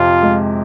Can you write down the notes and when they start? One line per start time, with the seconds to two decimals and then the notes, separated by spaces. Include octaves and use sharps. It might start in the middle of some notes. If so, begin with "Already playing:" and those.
Already playing: F2 C3 F4
0.23 G#3